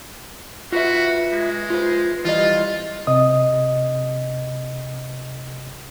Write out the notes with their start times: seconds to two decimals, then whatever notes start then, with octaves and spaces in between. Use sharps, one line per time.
0.72 F4 F#4 B4 E5
1.32 G#3
1.70 F4 B4 C5
2.25 E3 G3 F4 D#5
3.07 C3 D#5 D#6